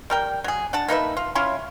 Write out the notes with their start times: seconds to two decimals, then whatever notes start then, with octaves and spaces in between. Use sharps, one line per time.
0.10 G3 A#4 G5
0.44 F#3 G#4
0.73 D4 F#5 A5
0.88 A#3 D#4 B4 E5
1.17 F4
1.35 C#4 E4 F4 C#5